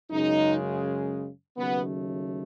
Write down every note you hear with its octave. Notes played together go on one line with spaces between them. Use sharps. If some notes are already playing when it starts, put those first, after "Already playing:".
F#2 C#3 G#3 D#4
D#2 C#3 F#3 A3 B3